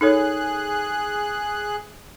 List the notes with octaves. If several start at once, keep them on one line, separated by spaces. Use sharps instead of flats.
D#4 G#4 A4 C#5 F#6